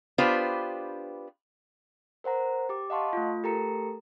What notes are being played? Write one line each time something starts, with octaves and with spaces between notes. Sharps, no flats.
B3 D4 F4 G4 B4 C5
A#4 C5 F#5 A#5
G4 D6
D#5 F5 F#5 A5 C6 C#6
A3 F4
A3 G4 A4 A#4 A#5 C#7